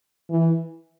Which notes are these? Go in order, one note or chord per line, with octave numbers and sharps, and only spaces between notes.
E3